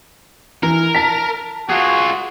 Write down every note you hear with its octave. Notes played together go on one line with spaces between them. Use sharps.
E3 A#4
A5 B6
F4 F#4 G#4